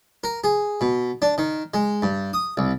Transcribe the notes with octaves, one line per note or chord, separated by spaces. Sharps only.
A#4
G#4
B2
D4
D#3
G#3
G2
D#6
C2